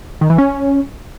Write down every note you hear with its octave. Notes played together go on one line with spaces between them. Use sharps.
D#3
E3
C#4